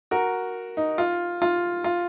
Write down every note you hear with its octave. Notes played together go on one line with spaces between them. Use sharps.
F#4 A#4
D#4
F4
F4
F4